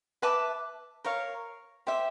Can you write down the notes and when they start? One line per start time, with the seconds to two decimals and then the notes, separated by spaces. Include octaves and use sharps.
0.22 B4 E5 A5 D6
1.04 A#4 C#5 F5
1.87 G4 C5 E5